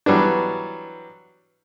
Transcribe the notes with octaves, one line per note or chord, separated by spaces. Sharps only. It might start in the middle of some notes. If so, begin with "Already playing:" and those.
E3 F#3 G3 B3 D4